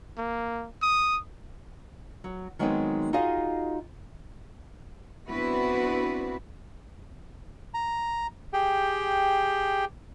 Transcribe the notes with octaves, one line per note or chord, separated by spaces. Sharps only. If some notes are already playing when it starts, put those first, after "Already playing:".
A#3
D#6
F#3
D#3 F#3 G#3 B3 C4 D#4
D#4 F4 F#4 G#4 D#5 F5
B3 C4 D4 E4 F#4 B4
A#5
G4 G#4 G5